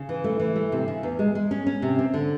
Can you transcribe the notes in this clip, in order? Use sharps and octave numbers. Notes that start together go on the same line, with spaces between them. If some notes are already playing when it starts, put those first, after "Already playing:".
Already playing: C#3
E3
A3
E3
A3
C3
C#3
E2
G#3
G#3
C#4
C#4
C3
C4
D3